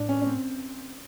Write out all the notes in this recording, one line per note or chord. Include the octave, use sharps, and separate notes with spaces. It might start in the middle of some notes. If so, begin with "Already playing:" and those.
Already playing: A2 D4
C#4
C#4
C4